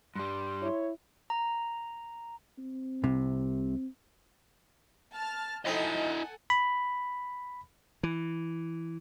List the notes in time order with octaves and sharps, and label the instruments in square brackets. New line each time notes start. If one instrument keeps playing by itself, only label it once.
[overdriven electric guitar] G2 G3 [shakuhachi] C6
[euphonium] E4 [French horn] C#5
[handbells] A#5
[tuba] C4
[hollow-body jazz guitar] C2 C3
[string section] A5 F6 A6
[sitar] F3 C4 D#4 [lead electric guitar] E4 D#5 [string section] A4 F#5 G#5
[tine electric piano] B5
[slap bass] E3